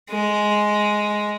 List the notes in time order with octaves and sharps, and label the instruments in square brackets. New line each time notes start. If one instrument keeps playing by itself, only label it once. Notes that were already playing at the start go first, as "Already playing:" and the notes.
[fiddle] G#3